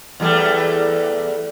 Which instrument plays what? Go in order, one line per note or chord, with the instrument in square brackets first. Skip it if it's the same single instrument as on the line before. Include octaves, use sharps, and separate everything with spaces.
[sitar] E2 G3 A3